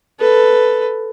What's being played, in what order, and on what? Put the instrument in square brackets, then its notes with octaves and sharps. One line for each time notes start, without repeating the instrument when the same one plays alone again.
[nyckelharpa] A4 B4